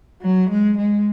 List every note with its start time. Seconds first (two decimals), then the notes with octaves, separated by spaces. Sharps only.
0.22 F#3
0.50 G#3
0.78 G#3